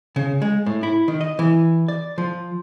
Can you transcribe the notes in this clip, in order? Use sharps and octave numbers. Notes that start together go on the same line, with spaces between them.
C#3
G#3
A2
E4
D#3
D#5
E3
D5
F3